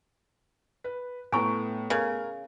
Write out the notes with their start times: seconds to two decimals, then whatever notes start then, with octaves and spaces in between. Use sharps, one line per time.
0.84 B4
1.32 A2 A3 B3 G#5 A#5 C#6
1.90 C#3 A#4